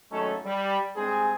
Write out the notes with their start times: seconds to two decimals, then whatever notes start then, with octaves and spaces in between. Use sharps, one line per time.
0.11 G#1 F#3 A3 C#4 D#4 A4
0.45 G3
0.96 G2 G#3 C4 G#4